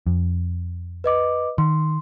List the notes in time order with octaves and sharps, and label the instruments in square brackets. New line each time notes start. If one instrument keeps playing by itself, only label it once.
[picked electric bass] F2
[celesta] B4 D#5 D6
[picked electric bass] D#3 [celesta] C6